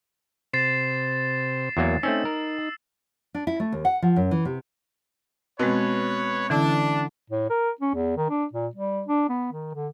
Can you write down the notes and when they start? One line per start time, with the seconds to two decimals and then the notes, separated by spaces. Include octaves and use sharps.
0.53 C3 C5 A6 C7 E7
1.77 E2 F#3 A#3 A#4
2.03 A3 C4 C#4 D#4 E6
2.25 A#4
3.35 D4
3.47 E4
3.60 A3
3.72 D#2
3.85 F#5
4.02 F3
4.16 F#2
4.31 E3
4.45 C3
5.59 B2 G#3 C4 B4 C#5
6.50 D3 E3 C#4 D4 E4
7.30 A2
7.50 A#4
7.81 C#4
7.94 E2
8.17 D#3
8.30 D4
8.53 A#2
8.75 G3
9.07 D4
9.29 B3
9.53 D#3
9.74 D3